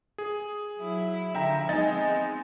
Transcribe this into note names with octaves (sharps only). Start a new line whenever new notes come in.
G#4
F#3 E4
D3 F3 E5 G5 A#5
G#3 B3 C4 D#4 G#5 A6